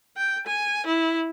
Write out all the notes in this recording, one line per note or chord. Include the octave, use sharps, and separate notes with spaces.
G5
G#5
E4